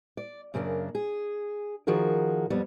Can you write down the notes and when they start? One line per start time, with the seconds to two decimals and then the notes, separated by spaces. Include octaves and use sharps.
0.17 D5
0.54 F#2 C#3 A#3 C#4 D4
0.95 G#4
1.87 D#3 F3 F#4 G#4 A#4
2.50 F2 G3 B3